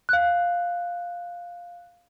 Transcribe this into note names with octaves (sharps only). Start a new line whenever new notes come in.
F5 F#6